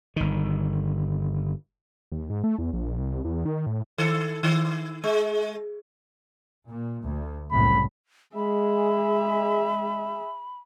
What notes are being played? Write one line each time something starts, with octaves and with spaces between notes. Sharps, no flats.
G1 D#3
D#2
G#2
A3
E2
A#1
C2
E2
D#3
A2
D#3 A4
D#3
G#3
A#2
D2
F#1 C2 A2 B5
G#3 G#4 E5 B5